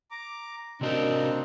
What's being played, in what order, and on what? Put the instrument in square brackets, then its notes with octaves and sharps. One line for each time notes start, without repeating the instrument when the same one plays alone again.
[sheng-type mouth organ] A#5 D6
[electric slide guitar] C3 F#4 A#4 [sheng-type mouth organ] C4 D4 D#4